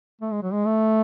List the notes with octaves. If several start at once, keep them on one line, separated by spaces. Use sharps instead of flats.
A3
G#3
F#3
G#3
A3